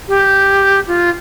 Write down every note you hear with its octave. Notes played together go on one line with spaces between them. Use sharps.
G4
F4